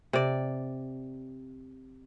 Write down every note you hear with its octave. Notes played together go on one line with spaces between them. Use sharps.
C3 D5